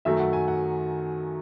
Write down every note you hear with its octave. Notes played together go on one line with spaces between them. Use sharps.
F#2 D#3 F#3 A3 E5
F#5
G#5
F#5